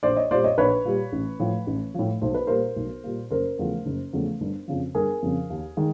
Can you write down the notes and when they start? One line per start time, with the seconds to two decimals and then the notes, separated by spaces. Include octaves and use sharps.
0.03 A#1 C5 D5
0.16 C#5 D#5
0.31 A#2 G3 C5 D5
0.44 C#5 D#5
0.58 A#1 B4 C#5
0.85 A#2 G3
1.12 A1
1.40 A2 F3
1.67 A1
1.94 A2 F3
2.22 B1 C5
2.34 B4
2.47 A#2 G3 A#3 A#4 C5
2.76 B1
3.04 A#2 G3 A#3
3.31 F#1 A#4 C5
3.59 E2 C#3 F3 A3
3.86 F#1
4.13 E2 C#3 F3 A3
4.41 G1
4.68 F2 C#3 F3
4.95 G1 G#4 A#4
5.22 F2 C#3 F3
5.50 D#2
5.77 D#3 G#3